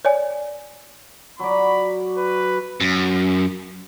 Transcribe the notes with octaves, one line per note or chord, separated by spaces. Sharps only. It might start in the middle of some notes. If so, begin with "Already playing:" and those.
C#5 D5 G#5
F#3 F#4 D5 B5
B4
F#2